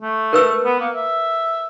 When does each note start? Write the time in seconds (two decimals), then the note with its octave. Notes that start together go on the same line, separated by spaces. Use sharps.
0.01 A3
0.33 A#4 B4 E6
0.64 B3
0.80 A#3
0.94 E5